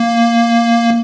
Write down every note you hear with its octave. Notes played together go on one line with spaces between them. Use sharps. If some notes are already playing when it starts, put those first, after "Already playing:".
Already playing: A#3